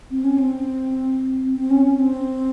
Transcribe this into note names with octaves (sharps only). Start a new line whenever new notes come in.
C4
C#4
C4
C4
C#4
C#4
C4